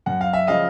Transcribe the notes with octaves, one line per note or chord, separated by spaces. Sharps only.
F#2 F#5
F5
E5
C#3 F3 D#5 F5